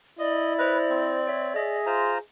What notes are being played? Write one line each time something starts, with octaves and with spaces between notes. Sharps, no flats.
E4 D5 D#5
B4 C5 D#5
C4
C#5 E5
G#4 D#5 E5
F4 C5 A#5